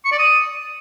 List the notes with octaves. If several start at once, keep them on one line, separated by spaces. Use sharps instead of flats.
C#6
D5
D#6